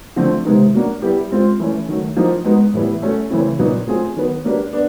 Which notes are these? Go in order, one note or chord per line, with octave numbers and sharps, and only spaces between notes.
D3 F3 A3 C4
C3 D#3 G#3 B3 D#4
F#3 A#3 D4 F#4
G3 B3 E4 G4
G#3 C4 F4
E3 A3 C#4
D#3 F#3 A3
F3 A#3 D#4 F#4
G#3 B3 D#4 F#4
A2 E3 G3 B3 E4
A3 C#4 F#4 A4
C#3 E3 A3 C4 E4
A#2 F#3 B3 D#4 F#4
F#3 A3 C4 F4 G#4
D#3 F#3 B3
F#3 A#3 D4 G4 B4
B3 D4